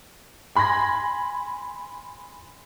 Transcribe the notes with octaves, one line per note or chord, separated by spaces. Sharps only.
G#5 B5 C6 G#6 A#6